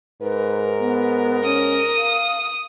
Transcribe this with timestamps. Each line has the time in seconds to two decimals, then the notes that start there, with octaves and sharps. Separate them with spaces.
0.22 G#2 A#4 B4
0.80 B3
1.44 C#4 D#6
1.98 F5